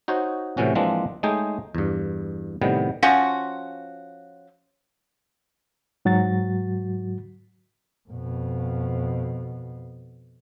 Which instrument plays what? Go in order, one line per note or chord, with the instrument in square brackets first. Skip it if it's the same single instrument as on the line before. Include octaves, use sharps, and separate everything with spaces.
[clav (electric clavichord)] D#4 F#4 C5 C#5
A2 C3 E3 C#4 F#4
E3 F3 G#3 A#3 C4 D4
G#3 A3 D#4 G#4 C#5 G5
E2 G2
A2 C3 D#3 G3 B3
[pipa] F3 C#4 F4 F#4
[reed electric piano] G#2 F#3 F#4 A6
[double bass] F2 B2